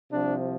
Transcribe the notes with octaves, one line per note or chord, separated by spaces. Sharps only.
C2 C3 F3 D4